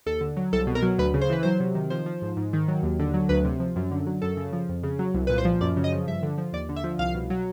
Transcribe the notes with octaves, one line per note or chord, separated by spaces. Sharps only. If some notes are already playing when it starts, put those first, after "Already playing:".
D#2 A4
D3
F#3
C2 A4
B2
A#4
F#3
D2 B4
C#3
C5
E3 B4
F#3 C5
C3
D#3
F3 C5
F3
G#2
G#2
D#3
F#3
D#2
D3
F#3
D2 B4
C3
F3
F#2
D3
F#3
F#2 A4
C#3
F3
F2
C#3
F#3
C2
A#2 B4
C5
F3
F#2 D5
C#3
D#5
F3
G2 E5
D3
F3
D#2 D5
D3
E5
F3
C2 F5
B2
F#3